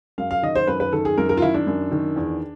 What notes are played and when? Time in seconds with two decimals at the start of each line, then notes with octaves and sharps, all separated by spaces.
0.18 F#2 F5
0.31 F5
0.43 D#3 D#5
0.55 C5
0.67 F#2 B4
0.80 B4
0.93 D#3 A4
1.05 G#4
1.18 F#2 A#4
1.29 A#4
1.37 F4
1.42 D#3 E4
1.54 D4
1.67 F#2
1.92 D#3
2.16 E2